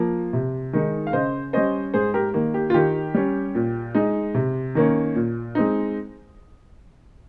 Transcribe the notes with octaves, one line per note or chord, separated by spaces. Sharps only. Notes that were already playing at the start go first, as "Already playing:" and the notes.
Already playing: F3 A#3
C3
D#3 G#3 D#4
F5
C#3 C5 D#5
G3 C#4 C5 D#5
G#2 G#4 C5
G4 A#4
D#3 A#3
G4
F4
D#3 G4
G3 C#4
A#2
G#3 D#4
C3
D#3 A#3 C#4
A#2
G#3 C4 D#4